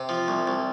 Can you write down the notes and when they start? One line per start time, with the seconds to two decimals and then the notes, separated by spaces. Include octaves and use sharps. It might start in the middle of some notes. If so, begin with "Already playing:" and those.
Already playing: C3
0.09 F3
0.28 C2
0.47 C2